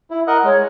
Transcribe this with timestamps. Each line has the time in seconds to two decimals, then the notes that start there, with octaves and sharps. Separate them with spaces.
0.10 E4
0.27 A#4 D#5 F#5
0.44 G#3 C#5